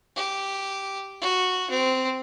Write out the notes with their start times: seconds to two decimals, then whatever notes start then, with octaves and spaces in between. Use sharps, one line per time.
0.16 G4
1.22 F#4
1.70 C4